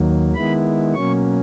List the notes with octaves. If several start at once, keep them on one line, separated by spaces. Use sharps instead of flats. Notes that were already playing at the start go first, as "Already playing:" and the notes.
Already playing: D#2 D#3 F#3 A#3
D#3 G#3 B3 E4 B5
B2 F#3 A#3 C#4 C#6